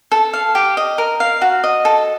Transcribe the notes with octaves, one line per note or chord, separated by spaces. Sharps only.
A4
F5
G4
D#5
A#4
F5
F#4
D#5
A4